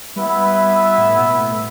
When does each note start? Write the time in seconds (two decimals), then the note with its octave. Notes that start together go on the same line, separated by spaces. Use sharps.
0.16 G3 B3 E4 B4 E5
0.98 A2
1.17 B2
1.38 A2
1.51 A2